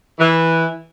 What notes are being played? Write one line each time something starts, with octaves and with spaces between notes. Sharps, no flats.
E3